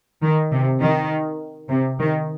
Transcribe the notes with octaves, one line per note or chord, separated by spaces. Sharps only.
D#3
C3
D#3
C3
D#3